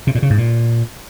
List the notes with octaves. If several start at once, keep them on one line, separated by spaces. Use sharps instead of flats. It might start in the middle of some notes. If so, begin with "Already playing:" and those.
C3
A#2
C#3
G#2
A#2